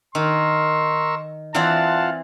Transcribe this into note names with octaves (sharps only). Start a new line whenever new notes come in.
D#3 A#4 C6 C#6 E6
E3 C4 F4 D5 F#5 A5